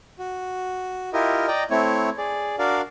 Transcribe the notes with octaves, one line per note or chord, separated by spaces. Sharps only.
F#4
E4 F4 G4 A#4 D#5
D5 D#5 G5 A#5
A3 C4 E4 C#5
G#4 D5
D4 F#4 A#4 D5 F5